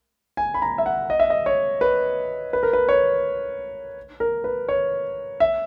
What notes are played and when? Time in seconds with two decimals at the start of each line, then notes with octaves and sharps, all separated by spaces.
0.37 G#5
0.54 B5
0.62 A#5
0.78 E5
0.86 F#5
1.10 D#5
1.20 E5
1.30 D#5
1.46 C#5
1.81 B4
2.53 B4
2.63 A#4
2.73 B4
2.89 C#5
4.20 A#4
4.44 B4
4.69 C#5
5.40 E5